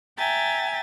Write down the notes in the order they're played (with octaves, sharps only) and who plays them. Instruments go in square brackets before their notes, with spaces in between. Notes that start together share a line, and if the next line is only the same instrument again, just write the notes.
[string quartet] E5 G5 G#5 A#5 A6